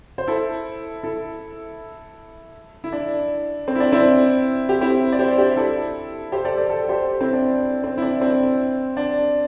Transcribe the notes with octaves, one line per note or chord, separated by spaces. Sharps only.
C5
E4 A4
E4 A4
E4
D4
C4
E4
D4
C4 E4
G4
C4 E4
D5
G4 C5
D4 G4
E4 A4
G4 C5
A4 D5
A4 D5
A4 D5
G4 C5
C4 E4
D4
C4
E4
D4
C4
D4